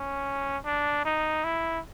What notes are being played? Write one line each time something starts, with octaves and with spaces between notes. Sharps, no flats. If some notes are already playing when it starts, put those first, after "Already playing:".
Already playing: C#4
D4
D#4
E4